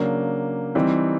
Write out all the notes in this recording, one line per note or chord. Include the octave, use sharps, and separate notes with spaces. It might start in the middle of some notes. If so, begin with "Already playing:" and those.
Already playing: C#3 F#3 A#3 D4
E3 G3 C4 D#4